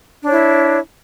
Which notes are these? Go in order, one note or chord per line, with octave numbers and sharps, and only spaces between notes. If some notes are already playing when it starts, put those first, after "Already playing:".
D4 E4 C#5